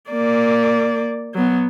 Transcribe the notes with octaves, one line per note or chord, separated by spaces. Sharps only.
A#3 D5
F#3 B3